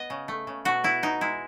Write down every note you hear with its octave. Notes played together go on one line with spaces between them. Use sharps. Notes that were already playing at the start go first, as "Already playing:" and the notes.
Already playing: B3 D#5
C#3
A3
C#3
B2 F#4
B3 E4
B2 D#4
G#3 E4